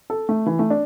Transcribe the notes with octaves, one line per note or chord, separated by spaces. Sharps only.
A4
A3
E3
A3
D4